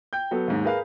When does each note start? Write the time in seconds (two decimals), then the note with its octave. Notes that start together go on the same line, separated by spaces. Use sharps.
0.13 G5 G6
0.31 F#3 B3 A4
0.48 D#2 G#2
0.64 G#4 A#4 B4 F5